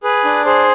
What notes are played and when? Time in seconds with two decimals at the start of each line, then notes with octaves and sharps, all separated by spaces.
0.03 G#4 B4
0.25 D4
0.45 G#4 C5